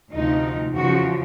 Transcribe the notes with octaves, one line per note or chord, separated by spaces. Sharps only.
D2 C3 F3 D#4
E2 C#3 F3 F#4